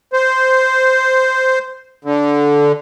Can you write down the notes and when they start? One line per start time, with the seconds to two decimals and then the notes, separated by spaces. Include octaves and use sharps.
0.13 C5
2.05 D3